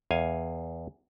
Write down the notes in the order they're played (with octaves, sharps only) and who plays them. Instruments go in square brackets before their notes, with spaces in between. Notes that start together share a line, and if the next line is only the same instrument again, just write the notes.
[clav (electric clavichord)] E2 F5 G#5